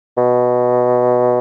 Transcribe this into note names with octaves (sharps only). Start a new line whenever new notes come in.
B2